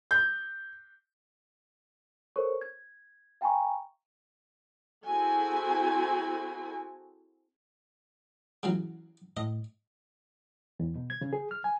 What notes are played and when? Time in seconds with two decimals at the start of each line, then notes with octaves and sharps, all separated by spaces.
0.11 G6
2.36 A4 A#4 C5 C#5 C#6
2.61 G#6
3.41 F5 G5 G#5 A#5 B5 C#6
5.05 C4 E4 F#4 G#4 A4 G#5
8.63 C#3 E3 F#3
9.37 A2 D#5
10.80 E2
10.95 B2
11.10 G#6
11.21 C#3
11.33 G#4
11.51 F6
11.64 G#5